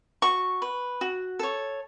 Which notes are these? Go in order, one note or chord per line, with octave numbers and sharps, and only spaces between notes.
F#4 C#6
B4
F#4
A4 C#5